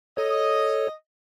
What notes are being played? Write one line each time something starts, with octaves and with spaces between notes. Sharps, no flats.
A4 C#5 D#5